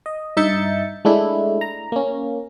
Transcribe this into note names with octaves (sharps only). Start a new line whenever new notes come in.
D#5
G2 D#4 E5 G6 A6 C#7
G#3 A3 D4 E4
A#5
A#3 C#4